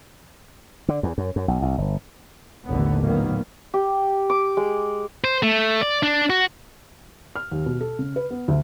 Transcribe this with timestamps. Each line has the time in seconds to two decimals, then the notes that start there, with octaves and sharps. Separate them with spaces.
0.88 D3
1.03 E2
1.18 F#2
1.36 F#2
1.48 B1
1.62 C2
1.78 G1
2.66 A1 D#2 D3 B3
3.03 A#2 D#3 F#3 A#3 B3
3.74 G4
4.30 D6
4.57 G#3
5.24 C5
5.43 A3
5.81 D5
6.03 D4
6.30 F#4
7.36 F6
7.51 D#2
7.66 B2
7.81 A4
7.99 C#3
8.16 B4
8.30 B3
8.48 D2